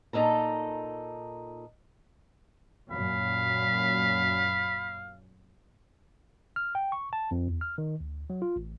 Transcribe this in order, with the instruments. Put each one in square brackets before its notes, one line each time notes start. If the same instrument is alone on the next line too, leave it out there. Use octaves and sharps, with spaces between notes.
[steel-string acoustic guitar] A#2 D#4 A4 A#5
[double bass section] F#2 A#2 [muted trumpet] F5 [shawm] B5
[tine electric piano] F6
G5
C#6
A5
F2
E2
F6
D#3
D2
F#3
F4
A1